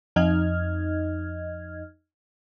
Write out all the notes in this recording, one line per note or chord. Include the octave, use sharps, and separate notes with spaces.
F2 D#4 D#5 F6 G#6